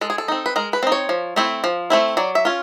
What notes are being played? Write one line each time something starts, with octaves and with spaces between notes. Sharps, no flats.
G#3 A4
G#4
A4
C4 D#4
B4
G#3 A#4
B4
C4 D#4
C#5
F3
A3 C4 E4
F3
A3 C4 E4
F#3 D5
E5
C#4 F4